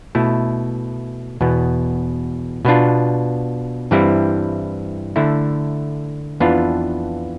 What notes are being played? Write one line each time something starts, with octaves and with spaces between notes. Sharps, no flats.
B2 A3 E4
E2 B2 B3
B2 B3 D4 F4
G2 E3 G3 C4 E4
D3 A3 E4
F2 E3 B3 D4 F4